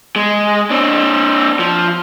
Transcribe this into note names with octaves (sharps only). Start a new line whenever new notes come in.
G#3
C4 D4
F3